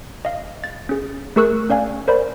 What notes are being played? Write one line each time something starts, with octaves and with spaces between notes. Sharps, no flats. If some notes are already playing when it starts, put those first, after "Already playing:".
D#5 F5
A6
C#4 G#4
A3 G#4 A#4 C#6 E6 F#6
C#4 D5 F5 G#5
A#4 C5 D5 B5